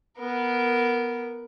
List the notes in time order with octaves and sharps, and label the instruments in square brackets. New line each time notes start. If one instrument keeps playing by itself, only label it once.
[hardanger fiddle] B3 A#4